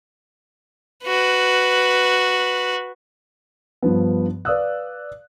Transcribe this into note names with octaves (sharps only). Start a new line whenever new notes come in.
F#4 B4
G2 F3 B3
B4 D5 F5 D#6 E6 F#6